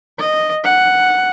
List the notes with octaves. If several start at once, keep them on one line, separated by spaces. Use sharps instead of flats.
D#5
F#5